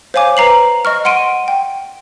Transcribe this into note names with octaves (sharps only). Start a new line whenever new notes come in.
C5 C#5 F5 G#5 D6
B4 A#5 C7 F#7
D#5 C#6 F6
F#5 C6 D7 D#7
G5